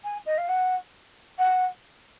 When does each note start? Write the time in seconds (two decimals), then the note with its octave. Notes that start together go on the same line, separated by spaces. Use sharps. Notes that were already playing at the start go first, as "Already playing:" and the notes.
0.04 G#5
0.26 D#5
0.38 F5
0.49 F#5
1.38 F#5